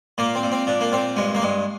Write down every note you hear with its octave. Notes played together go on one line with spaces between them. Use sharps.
A#2 A#3
C4
A#2
C4
A#2 D4
A#3
A#2 C4
G2 G#3
A#3
G2 G#3